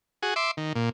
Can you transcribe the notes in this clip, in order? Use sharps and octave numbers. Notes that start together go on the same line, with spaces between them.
F#4 G#4
E5 C6 D6
D#3
A#2